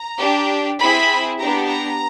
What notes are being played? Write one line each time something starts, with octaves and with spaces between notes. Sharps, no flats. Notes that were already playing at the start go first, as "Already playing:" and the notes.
Already playing: A#5
D4 G4
C4 E4 G#4 B5
B3 D4 G4 A#5
A#5